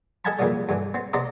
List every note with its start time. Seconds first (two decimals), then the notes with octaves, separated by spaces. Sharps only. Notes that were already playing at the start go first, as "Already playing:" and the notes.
0.25 A4 D#5 F#5 G#5 A5 B5
0.39 F2 A#2 C#3 E3 F3 G3
0.69 G2 D3 E3
0.94 B3 C4
1.13 C3 B3 C4 D4 D#5 A#5